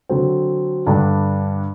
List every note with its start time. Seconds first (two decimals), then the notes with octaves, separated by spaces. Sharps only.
0.10 D3 F#3 C4
0.86 G2 D3 G3 D4